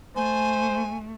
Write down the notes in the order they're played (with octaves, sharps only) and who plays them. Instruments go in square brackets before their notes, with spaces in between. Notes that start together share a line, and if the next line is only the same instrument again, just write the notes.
[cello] A3 [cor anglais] C5 [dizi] G#5